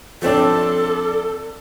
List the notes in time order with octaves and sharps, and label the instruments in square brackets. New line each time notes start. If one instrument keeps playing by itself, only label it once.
[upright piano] F3 C4 D4 [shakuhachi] A4